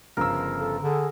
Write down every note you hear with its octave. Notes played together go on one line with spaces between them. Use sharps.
G1 C#3 F3 A#4 E6
A4
D3 G#4